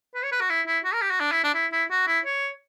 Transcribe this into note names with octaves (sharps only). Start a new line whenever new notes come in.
B4
C#5
B4
F#4
E4
E4
F#4
A#4
G4
F#4
D4
E4
D4
E4
E4
F#4
E4
C#5